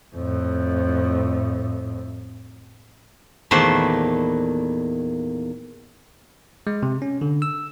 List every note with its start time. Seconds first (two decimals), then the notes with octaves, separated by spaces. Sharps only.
0.16 F2 A2
3.51 E2 A#2 D#3 A3 B4 C5
6.67 G#3
6.83 C3
7.02 C#4
7.21 D3
7.42 E6